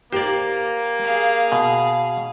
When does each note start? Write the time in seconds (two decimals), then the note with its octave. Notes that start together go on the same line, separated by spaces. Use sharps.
0.12 A#3 G4 C5 D5
1.03 G#4 F5
1.52 B2